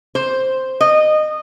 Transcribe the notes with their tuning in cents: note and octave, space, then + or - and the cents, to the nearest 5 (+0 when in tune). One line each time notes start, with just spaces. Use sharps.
C5 +0
D#5 -20